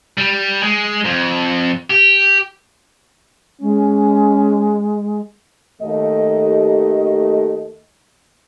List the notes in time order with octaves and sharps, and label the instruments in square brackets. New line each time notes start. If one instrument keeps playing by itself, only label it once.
[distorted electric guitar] G3
G#3
F2
G4
[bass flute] G#3 [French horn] C#4
[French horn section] D#2 A3 D#5